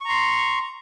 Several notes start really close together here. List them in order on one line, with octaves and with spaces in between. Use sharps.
C#6 A#5 C6